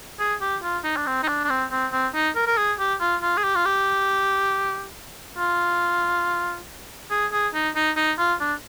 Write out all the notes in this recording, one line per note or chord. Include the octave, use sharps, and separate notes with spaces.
G#4
G4
F4
D#4
D4
C4
D#4
D4
D4
C4
C4
C4
D#4
A#4
A#4
G#4
G4
F4
F4
G#4
G4
F4
G4
F4
G#4
G#4
D#4
D#4
D#4
F4
D4